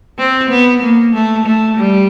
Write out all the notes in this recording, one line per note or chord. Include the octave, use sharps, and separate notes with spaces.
C4
B3
A#3
A3
A3
G3